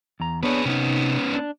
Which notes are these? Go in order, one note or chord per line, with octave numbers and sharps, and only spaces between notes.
E2 A#5
B3 D4 G#4 B4 C#5
C3 B3 C#4 D#4
D4